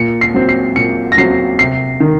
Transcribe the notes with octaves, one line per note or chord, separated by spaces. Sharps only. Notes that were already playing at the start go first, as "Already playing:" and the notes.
Already playing: A#2 C#7
C7
F#3 C4
C7
A#2 C#7
A#6
F#3 C4 C7
C3 C7
D#3